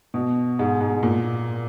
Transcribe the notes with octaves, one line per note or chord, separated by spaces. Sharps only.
B2
G#2
G#2
A#2